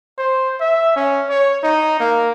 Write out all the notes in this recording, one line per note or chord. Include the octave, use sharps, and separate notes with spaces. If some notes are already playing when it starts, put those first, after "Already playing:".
C5
E5
C#4
C#5
D#4
A#3